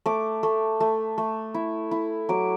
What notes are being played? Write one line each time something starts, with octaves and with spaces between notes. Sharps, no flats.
A3 D6
A3
A3
A3
E4
E4
F#3 D6